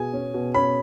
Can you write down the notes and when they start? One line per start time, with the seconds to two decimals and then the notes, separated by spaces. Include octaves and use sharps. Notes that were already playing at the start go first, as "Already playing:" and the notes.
Already playing: B2 G#4 G#5
0.13 C#4
0.34 B2
0.54 C#4 B5